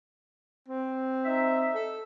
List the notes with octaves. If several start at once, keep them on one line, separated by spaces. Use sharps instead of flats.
C4
D#4 E5
A4